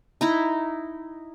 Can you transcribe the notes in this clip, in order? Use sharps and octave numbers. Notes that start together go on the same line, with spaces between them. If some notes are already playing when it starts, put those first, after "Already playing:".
D#4 E4 A#5